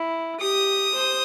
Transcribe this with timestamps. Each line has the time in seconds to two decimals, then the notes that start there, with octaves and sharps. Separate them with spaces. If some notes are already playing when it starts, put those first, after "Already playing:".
Already playing: E4
0.40 G4 D#6
0.95 C5